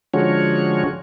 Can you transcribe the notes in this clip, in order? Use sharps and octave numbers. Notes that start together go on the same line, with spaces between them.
D3 F3 G#3 C#4 F#4 C#5